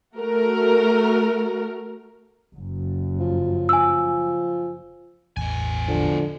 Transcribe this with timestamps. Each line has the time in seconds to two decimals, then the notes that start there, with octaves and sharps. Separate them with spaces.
0.15 A3 F#4 A#4
2.55 F#1 F#2
3.20 F3
3.69 G#5 E6
5.37 A1 E2 B2 E3 G#5
5.88 D3 F3